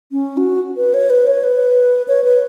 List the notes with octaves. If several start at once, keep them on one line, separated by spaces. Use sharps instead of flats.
C#4
F#4
B4
C#5
B4
C#5
B4
C#5
B4